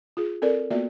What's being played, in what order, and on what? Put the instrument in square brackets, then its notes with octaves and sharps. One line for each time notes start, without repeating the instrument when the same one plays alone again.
[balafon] F4 G#4
C4 A4 A#4 D5
A#3 B3 F4 F#4 D5 E5